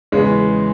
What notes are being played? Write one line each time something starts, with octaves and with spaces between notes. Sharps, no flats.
E2 C#3 E3 G#3